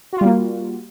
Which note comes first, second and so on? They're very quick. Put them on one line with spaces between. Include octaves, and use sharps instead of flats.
F#4 F4 G3 A#3